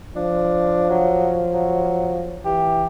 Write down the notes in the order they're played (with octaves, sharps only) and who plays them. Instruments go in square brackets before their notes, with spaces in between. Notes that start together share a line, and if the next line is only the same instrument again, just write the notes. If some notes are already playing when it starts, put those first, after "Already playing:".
[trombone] F3 [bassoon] D4
[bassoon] F#3
F#3
[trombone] E3 [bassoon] G4